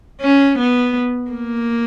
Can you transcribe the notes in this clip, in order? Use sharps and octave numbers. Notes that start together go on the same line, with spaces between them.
C#4
B3
A#3